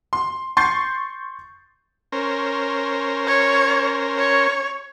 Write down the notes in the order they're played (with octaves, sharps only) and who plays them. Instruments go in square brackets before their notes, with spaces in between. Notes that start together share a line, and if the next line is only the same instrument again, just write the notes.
[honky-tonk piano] C6
C6 C#6 G6 A6 C7
[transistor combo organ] C#4 A#4 C5
[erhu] C#5
C#5